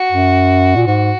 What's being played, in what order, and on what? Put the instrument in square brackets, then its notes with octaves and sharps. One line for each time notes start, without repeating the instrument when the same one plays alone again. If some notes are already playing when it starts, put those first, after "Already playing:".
Already playing: [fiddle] F#4
[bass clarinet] F#2
A#2
[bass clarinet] G#2 [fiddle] F#4